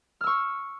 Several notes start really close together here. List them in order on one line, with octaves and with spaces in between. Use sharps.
F6 E6 C#6